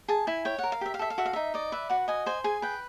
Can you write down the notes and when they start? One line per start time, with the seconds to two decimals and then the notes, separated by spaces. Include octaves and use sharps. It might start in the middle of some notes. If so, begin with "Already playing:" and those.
0.08 G#4 A5
0.27 E4 G#5
0.45 C#5 G5
0.59 A#4 F#5
0.72 F5
0.81 G4 E5
0.94 F5
0.99 A4 E5
1.10 F5
1.18 F#4 E5
1.25 F5
1.33 D#4 E5
1.54 D5 D#5
1.72 B4 E5
1.90 F#4 F#5
2.08 D#5 G#5
2.26 C5 G#5
2.44 G#4 G#5
2.62 B4 G5